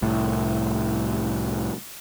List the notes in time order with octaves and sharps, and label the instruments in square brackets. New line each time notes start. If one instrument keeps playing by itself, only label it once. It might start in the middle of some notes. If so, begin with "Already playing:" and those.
[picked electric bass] C2 A2